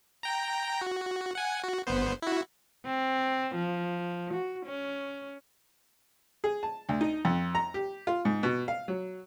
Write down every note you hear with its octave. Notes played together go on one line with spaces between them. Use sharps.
G5 A#5
F#4
F#5 G#5
F#4
G1 B3 C5
E4 F#4
C4
F3
F#4
C#4
G#4
A5
D2
D#4
F2
A#5
G4
F4
G#2
B2
F5
F#3